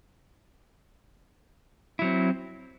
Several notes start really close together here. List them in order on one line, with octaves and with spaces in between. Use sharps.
E4 F#3 C4